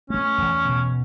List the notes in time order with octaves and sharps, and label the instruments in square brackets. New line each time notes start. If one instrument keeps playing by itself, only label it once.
[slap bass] A3 [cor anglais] C#4
[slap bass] E2
B2